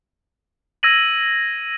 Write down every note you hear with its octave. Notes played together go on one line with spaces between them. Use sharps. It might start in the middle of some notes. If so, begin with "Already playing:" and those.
E6 G#6 A#6 D#7 F#7